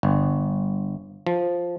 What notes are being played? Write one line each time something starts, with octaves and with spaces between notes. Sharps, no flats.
G1
F3